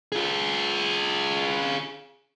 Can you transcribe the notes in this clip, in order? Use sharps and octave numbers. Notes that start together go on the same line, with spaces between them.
F4 G#4